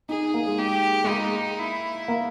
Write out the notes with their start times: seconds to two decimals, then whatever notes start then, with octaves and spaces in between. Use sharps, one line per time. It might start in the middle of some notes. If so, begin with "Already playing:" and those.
0.09 D#4 G#4
0.34 A#3
0.47 G#3
0.59 G4
1.04 G#3
1.08 A#3 D#4
1.59 E4
2.08 A#3